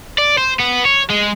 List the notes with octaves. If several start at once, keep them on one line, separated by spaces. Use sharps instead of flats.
D5
C5
B3
C#5
G#3